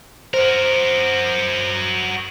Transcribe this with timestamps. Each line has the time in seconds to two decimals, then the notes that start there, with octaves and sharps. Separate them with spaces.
0.34 F#4 A#4 C5